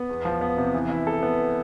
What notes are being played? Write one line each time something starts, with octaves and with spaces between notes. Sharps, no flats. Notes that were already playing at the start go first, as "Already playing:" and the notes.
Already playing: B3
E2
F3
B3
C3
E3
E4
A4
B3